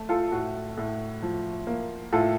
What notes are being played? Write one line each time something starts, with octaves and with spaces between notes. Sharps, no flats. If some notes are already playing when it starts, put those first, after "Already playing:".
Already playing: A3
F4 A4
A2 F#4
A2
F3
A#3
A2 F4 A4